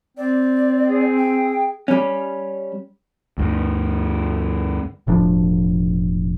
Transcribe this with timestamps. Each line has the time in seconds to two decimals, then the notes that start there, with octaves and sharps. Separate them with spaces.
0.17 C4 D5
0.88 G#4
1.17 G5
1.88 G3 C#4
3.38 D2 G2
5.07 E1 A2 F3 D4